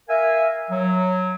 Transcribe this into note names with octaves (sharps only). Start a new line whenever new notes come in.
A#4 E5 F5 G#5
F#3